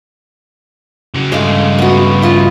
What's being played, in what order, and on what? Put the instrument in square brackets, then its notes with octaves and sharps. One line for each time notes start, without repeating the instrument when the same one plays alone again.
[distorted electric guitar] C#3 F#3
[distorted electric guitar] G2 C#3 [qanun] G#3 A3 F5
[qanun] B3 F#4
E4 F4 D#5